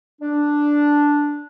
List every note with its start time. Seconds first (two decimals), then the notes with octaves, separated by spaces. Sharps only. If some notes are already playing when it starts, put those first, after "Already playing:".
0.21 D4